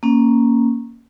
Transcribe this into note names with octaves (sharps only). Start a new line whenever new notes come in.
A#3 C#4